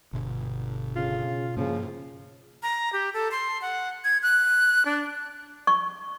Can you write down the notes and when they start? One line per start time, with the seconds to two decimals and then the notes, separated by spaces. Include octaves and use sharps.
0.13 G1 B2
0.96 C#3 F4
1.57 G2 C#3 F3 A#3
2.63 A#5
2.93 G4
3.14 A4
3.31 C6
3.62 F#5
4.04 G#6
4.23 F#6
4.85 D4
5.67 C#6